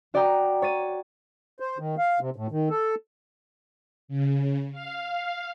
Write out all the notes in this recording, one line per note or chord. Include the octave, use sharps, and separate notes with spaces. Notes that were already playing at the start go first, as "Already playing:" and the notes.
F#4 D5 F#5 G5 A#5 D#6
C#5 A6 D#7
C5
D#3
F5
C3
A2
D#3
A4
C#3
F5